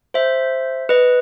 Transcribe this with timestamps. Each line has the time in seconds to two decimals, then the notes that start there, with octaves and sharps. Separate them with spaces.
0.14 C5 E5
0.89 B4 D#5